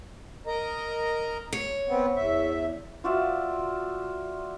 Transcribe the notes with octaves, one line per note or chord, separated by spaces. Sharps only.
A#4 D#5 A#5
C#5
B3 C4
E2 E5
F4 F#4 D5 E5